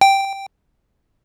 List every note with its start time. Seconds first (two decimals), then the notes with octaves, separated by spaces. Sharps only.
0.01 G5